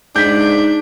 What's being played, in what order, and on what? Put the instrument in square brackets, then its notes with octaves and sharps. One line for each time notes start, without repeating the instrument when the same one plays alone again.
[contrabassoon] G#2 [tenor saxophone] D4 [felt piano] G6 B6